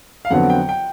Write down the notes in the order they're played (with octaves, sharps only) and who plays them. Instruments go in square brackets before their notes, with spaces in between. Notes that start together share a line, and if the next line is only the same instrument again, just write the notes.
[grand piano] F5
[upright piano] F2 D3 F#3 B3 [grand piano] F#5
[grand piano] G5
G5